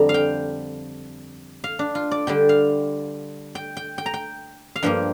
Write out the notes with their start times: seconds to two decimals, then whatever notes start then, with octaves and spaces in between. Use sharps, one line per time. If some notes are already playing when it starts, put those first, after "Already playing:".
Already playing: F2 D3 G3 A#5
0.09 F5
0.14 G5
1.64 F5
1.79 D4
1.95 F4
2.11 D5
2.27 D3 G3 D4 G5
2.49 F5
3.55 G5
3.77 G5
3.98 G5
4.06 A#5
4.14 G5
4.76 F5
4.83 G2 F3 A#3 G5